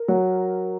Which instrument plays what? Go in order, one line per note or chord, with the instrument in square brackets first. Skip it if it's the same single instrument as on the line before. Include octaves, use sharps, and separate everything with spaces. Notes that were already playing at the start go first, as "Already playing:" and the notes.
Already playing: [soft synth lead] A#4
[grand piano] F#3